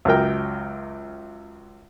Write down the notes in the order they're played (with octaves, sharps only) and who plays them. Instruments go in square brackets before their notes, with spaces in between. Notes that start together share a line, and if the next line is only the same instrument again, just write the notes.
[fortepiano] C#2 F#2 A#4 G5